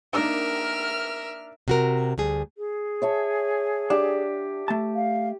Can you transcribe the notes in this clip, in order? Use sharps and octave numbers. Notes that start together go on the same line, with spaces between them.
A#3 D4 D#4 A#4 E5 F6
C3 F#4 A#4
D2 G3 G#4
G#4
C#5 E5 A5
D4 G4
A3 A5
F5